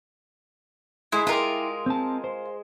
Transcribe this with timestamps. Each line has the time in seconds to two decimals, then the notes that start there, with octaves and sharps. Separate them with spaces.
1.12 G#3 E4
1.27 E4 F4 G4 A#4
1.86 C4 A5
2.24 C5